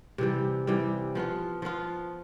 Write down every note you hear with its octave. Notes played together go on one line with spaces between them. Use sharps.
C3 E3 G3
C3 E3 G3
F3 B3 F4
F3 B3 F4